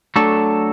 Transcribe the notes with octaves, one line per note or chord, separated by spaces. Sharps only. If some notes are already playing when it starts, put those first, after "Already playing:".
F#3 A3 D4 A4